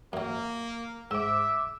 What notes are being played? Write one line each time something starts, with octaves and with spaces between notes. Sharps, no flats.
F#2 F#3 A#3
G#2 E5 D6 E6